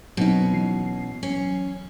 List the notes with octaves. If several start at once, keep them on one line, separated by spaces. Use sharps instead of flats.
B2 F#3 C4 C#4 D#4
E3 F#3 C7
C#4